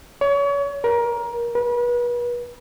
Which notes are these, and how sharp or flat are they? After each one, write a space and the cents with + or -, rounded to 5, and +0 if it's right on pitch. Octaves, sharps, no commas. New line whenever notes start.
C#5 +30
A#4 +20
B4 -35